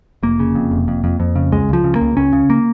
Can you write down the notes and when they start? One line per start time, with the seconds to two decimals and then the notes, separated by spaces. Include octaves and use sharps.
0.23 F1 A#3
0.40 C#3
0.55 F2
0.72 F1
0.88 F2
1.04 F2
1.20 F2
1.36 C#3
1.52 C#2 G#3
1.69 C#2 F3
1.84 C#3
1.96 A#3
2.01 C#2
2.17 C#2 C#4
2.33 C#3
2.50 A#3